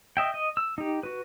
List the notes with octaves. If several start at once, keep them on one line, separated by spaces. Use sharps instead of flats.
D#5 E5 G5
D#5
E6
D#4 G4
F#4 B4